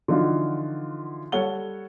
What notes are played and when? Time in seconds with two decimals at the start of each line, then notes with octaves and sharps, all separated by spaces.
0.08 D3 E3 F3 D#4 F4 F#4
1.32 G3 A4 C#5 F#5 G7